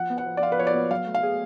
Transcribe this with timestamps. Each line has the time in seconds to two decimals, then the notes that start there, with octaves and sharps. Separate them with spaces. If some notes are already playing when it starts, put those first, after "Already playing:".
Already playing: F3 F#5
0.10 B3
0.18 F#5
0.26 F3
0.37 D5
0.42 F4 F5
0.52 B4
0.59 F3 C#5
0.67 D5
0.74 B3
0.90 F#3 F5
1.06 A3
1.14 F5
1.23 G#4